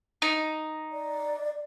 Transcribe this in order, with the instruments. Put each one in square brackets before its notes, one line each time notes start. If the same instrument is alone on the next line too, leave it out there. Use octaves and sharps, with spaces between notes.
[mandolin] D#4
[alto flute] D5